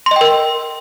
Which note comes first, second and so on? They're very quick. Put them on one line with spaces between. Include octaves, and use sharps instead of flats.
C6 D#5 G5 A#4